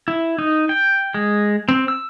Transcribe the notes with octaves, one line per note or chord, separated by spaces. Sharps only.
E4
D#4
G5
G#3
C4
E6